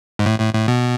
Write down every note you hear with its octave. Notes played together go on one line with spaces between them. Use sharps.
G#2
A2
A2
A2
B2